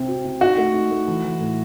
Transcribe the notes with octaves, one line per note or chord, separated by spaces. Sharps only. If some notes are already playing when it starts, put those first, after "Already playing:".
Already playing: C3 C4
F#4
C3
D#4 F#4
A3
D#4
A3
E3
E3
A2